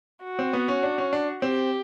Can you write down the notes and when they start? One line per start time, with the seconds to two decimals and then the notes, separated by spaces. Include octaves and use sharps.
0.24 F#4
0.39 C4
0.53 B3
0.68 C#4
0.83 D4
0.98 C#4
1.13 D4
1.42 C4 G4